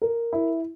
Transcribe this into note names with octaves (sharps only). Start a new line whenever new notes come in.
A#4
E4